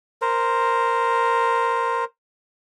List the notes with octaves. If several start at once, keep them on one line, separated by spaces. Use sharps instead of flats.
A#4 C5